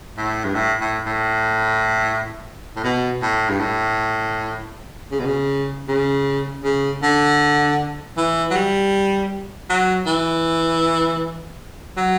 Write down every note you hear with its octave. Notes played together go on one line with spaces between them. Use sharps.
A2
G2
A2
A2
A2
A2
B2
A2
G2
A2
C#3
B2
C#3
C#3
C#3
D3
E3
F#3
G3
F#3
E3
F#3